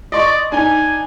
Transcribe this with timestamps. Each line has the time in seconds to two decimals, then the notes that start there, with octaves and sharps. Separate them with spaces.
0.12 D5 D#5 C6 C#6
0.52 D4 D#4 G#5